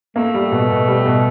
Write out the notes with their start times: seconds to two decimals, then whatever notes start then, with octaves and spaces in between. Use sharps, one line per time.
0.16 A3 A#3
0.34 G3
0.52 B2
0.70 B2
0.88 G3
1.06 B2